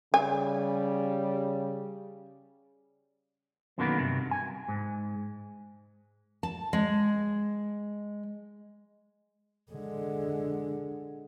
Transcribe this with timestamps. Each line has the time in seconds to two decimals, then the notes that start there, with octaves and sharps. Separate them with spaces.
0.14 C#3 G3 G#5
3.78 F#2 B2 D3 D#3 A#3 B3
3.98 G2 C3
4.31 G#5
4.68 G#2
6.43 A5
6.73 G#3
9.72 D3 G#3